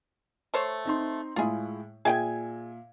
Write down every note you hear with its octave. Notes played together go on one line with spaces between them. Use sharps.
A3 C5 C#5
C4 D#4 C6
A2 G#3 E4 F4 G#4
A#2 G#4 E5 G5 G#5 G#6